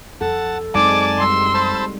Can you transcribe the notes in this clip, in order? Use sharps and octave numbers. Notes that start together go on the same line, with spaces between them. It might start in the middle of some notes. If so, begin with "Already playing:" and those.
F2 A4 F#5 A5
F#2 G#3 C4 D#4 D5 G#5 A5 D6
G3 C6 E6
C5 A5 B5